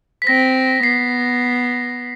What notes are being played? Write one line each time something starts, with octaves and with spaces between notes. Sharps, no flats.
B6
C4 A#6
B3 C7